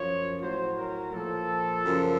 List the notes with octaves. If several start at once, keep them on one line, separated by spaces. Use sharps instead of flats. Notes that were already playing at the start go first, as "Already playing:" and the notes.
Already playing: F#2 F3 C#5
A2 F#3 C5
A#4
A#2 F3 A4
F#2 C#3 F3